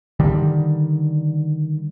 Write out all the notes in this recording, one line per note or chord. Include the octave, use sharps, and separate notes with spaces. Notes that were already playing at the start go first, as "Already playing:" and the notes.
D3 D#3 G3